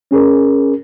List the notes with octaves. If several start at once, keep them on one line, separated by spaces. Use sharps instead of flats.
C#4 G#4 A#4